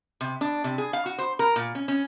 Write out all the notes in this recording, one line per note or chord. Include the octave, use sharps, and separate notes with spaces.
C3
D4
C3
G#4
F5
F#4
C5
A#4
A#2
C#4
C#4